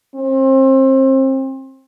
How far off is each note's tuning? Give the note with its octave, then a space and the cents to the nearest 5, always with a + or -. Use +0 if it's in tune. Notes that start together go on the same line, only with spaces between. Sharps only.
C4 +30